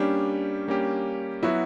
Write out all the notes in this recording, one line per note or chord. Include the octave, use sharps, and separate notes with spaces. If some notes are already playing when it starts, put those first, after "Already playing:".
Already playing: G3 A#3 C#4 D4 G4
G3 A#3 C#4 G4
F#3 B3 E4 F#4